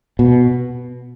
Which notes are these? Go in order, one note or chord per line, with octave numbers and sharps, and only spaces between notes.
B2